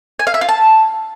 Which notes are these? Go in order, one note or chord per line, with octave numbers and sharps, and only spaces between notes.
G#5
F5
E5
F4
A5